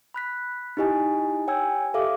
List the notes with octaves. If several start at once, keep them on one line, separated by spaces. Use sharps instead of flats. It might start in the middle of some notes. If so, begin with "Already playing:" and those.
B5 F#6 B6
D#4 E4 G4 D#5 G#5
C#5 G5 G#5 E6 G#6
G4 A4 E5 F5 D6